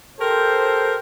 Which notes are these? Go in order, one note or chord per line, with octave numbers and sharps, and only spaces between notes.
G4 A4 A#4 C5